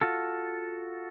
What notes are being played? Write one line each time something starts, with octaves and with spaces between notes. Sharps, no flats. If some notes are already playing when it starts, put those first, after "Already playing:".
F4 F#4 A4